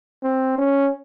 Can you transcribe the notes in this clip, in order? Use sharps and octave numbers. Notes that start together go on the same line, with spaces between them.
C4
C#4